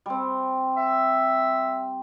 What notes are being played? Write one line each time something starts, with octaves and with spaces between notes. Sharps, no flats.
G3 C4
E5